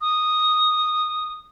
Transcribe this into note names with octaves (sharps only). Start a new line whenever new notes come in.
D#6